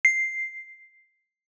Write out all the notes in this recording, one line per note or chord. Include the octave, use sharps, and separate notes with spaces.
C7